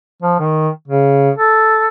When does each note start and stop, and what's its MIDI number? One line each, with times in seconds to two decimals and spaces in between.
0.22 0.35 53
0.39 0.69 51
0.88 1.30 49
1.38 1.87 69